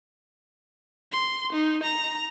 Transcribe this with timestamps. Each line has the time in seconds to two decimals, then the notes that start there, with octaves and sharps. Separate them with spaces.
1.12 C6
1.52 D#4
1.83 A#5